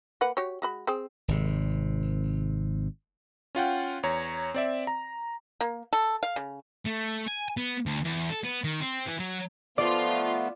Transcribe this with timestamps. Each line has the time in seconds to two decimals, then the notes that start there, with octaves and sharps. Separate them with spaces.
0.21 A#3 B4 F#5
0.37 F#4 G4 C#5
0.62 G#3 F#4 B5
0.87 C4 G#4
1.28 G#1 C3
3.55 C#4 F4 F#5 G5
4.03 E2 C#5 A#5
4.54 C4 D5 E5
4.87 A#5
5.61 A#3
5.93 A4
6.23 F5
6.36 C#3
6.86 A3
7.28 G#5
7.57 B3
7.86 D2
8.05 E2
8.30 A4
8.44 B3
8.64 D#3
8.80 C4
9.07 E3
9.20 F#3
9.78 F3 A3 B3 F4 D5